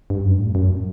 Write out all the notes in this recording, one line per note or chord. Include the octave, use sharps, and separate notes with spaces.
G2
F#2
A2
F#2